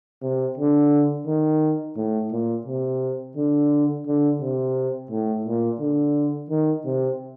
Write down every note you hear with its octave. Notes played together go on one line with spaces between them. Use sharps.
C3
D3
D#3
A2
A#2
C3
D3
D3
C3
A2
A#2
D3
D#3
C3